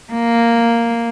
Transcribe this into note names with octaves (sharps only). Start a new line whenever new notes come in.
A#3